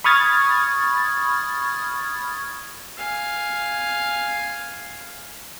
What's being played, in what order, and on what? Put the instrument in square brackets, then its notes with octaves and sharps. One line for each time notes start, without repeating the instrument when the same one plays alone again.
[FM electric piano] B5 C#6 D#6 F6 G#6 A6
[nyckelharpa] F5 G#5